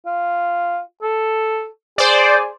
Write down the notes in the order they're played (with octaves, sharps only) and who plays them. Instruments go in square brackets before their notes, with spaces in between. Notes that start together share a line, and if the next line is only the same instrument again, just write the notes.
[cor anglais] F4
A4
[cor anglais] G#4 [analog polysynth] C5 D5